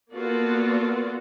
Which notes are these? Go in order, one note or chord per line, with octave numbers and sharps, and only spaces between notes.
A#3 B3 F4 F#4 A4 D5